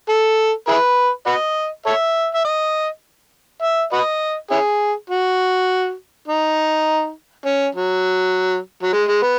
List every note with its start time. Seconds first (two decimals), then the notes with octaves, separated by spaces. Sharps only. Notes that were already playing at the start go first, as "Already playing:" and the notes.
0.09 A4
0.68 E4 G#4 B4
1.26 F#4 B4 D#5
1.86 A4 C#5 E5
2.34 E5
2.45 D#5
3.62 E5
3.93 F#4 B4 D#5
4.51 C#4 E4 G#4
5.10 F#4
6.28 D#4
7.46 C#4
7.75 F#3
8.82 F#3
8.93 G#3
9.08 G#3
9.22 B3